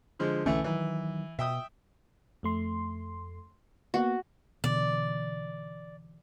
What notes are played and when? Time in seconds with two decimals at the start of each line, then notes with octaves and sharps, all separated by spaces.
0.19 D3 F3 G#3
0.46 B1 D3 E3 A3 C#4
0.64 D#3 E3 F#3
1.39 B2 E5 G5 D#6
2.43 F2 A3 C6
3.94 A#3 B3 F#4
4.64 B2 D3 E3 D5